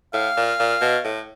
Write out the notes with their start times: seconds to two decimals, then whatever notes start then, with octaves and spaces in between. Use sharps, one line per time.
0.14 A2 F5
0.37 A#2
0.59 A#2
0.81 B2
1.04 A2